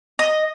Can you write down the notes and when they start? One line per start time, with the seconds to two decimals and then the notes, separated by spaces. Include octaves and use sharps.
0.19 D#5